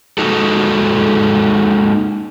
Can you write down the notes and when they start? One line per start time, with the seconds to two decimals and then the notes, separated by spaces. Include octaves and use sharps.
0.18 G#3 A#3 D#4 F#4 A4